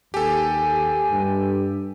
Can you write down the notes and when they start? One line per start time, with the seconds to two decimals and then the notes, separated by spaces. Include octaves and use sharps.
0.14 D#2 G4 A4 G#5
1.11 G2